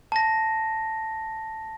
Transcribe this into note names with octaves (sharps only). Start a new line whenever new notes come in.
A5 A#6